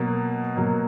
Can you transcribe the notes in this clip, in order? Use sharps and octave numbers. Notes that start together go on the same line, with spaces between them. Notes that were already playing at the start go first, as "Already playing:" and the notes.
Already playing: B2 F#3 A#3
B2 F#3 A#3